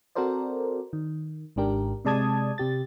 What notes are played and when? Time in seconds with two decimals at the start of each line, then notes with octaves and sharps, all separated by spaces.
0.15 C4 F#4 A4 A#4 C5 D5
0.93 D#3
1.56 G#1 G#2 D4 G4 A#4
2.05 C3 G#3 D5 A5 D#6 G#6
2.58 C3 G4 A6